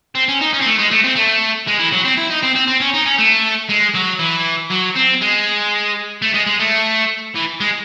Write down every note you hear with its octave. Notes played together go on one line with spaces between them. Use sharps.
C4
C#4
D#4
C#4
C4
A3
G#3
A3
C4
A3
G#3
E3
F#3
C4
E4
D#4
C4
C4
C4
C#4
D#4
C#4
A3
G#3
F#3
E3
F#3
C4
G#3
A3
G#3
G#3
A3
E3
G#3